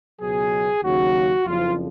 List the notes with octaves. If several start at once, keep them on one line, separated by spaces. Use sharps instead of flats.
C#2 B2 F#3 G#4
D#2 C#3 F#3 F#4
F#1 F2 F3 F4